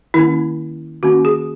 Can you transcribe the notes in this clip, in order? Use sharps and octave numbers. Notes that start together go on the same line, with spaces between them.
D#3 A#3 C#4 E4
D#3 A#3 C#4 F#4
G#4